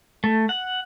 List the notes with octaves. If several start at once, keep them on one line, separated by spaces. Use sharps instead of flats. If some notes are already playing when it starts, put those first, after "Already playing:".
A3
F#5